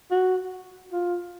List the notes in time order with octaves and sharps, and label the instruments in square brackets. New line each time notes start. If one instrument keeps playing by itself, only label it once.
[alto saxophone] F#4
F4